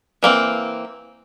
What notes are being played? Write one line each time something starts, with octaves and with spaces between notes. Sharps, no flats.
E3 A#3 C4